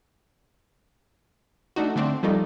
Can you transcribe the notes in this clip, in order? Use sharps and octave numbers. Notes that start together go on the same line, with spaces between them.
A3 D4 D#4 F#4
D3 A3 C4 D4
F3 G3 A3 A#3 D#4